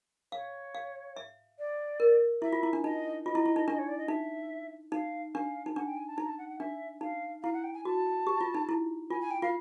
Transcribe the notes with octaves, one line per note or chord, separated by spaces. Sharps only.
C#5 F5
F5
E5
D5
A#4
E4 E5
F4
E4
D4
D#4 D#5
F4 D#5
E4
E4
D#4
D4
C#5
D5
D#5
D#4 E5
D#4 F5
D4 F5
D#4
D4 F#5
G5
G#5
A5
D#4 A#5
A5
F#5
F#5
D4 E5
D#4 F5
E4 F5
F#5
G5
G#5
F#4 A5
G4
F4
D#4
E4
F4 G#5
G#5
G5
F4 F5